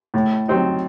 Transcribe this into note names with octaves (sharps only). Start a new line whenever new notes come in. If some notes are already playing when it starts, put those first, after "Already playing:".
A2
F#3 C4 D#4